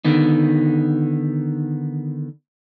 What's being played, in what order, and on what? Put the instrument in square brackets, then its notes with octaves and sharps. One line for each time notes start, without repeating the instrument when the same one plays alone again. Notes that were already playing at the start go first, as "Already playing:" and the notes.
[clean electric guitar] D3 D#3 B3 D#4